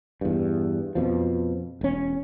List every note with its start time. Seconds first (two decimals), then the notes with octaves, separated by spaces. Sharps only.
0.21 E2 G2
0.95 F2 B2 F3
1.81 E1 C#4